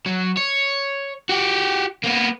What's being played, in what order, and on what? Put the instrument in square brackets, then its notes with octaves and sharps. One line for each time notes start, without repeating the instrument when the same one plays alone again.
[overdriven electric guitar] F#3
C#5
F#4 G4
A#3 B3